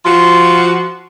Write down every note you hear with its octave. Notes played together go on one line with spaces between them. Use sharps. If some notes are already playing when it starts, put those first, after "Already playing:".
F3 F4 F#4